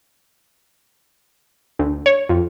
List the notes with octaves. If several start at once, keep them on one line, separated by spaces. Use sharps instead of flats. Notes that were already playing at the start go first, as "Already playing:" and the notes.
D2
C#5
F2